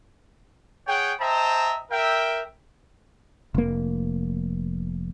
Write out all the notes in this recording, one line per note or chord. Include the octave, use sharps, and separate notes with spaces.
G#4 C#5 F#5 G5
C5 D#5 E5 G5 A5 A#5
A#4 E5 G5
F1 A#3